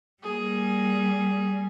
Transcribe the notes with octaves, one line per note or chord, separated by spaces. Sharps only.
G3 A#3 G#4